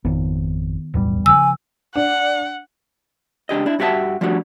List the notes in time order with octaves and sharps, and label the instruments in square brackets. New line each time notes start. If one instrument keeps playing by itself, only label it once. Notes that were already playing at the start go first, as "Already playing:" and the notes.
[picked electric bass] G#1 F2 [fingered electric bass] D#3 B3
[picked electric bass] D1 E2 G3 [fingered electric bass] B1 A2
[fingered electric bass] C#3 F3 [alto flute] G#5 [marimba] E6
[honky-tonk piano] D4 [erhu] F#5
[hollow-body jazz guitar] C#2 D4 G4 D#5
D4 E4
G2 F#4 G4 E5 F#5 A5
F3 G3 A3 D4 D#4 F#4